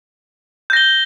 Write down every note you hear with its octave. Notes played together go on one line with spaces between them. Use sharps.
G6 A#6 G7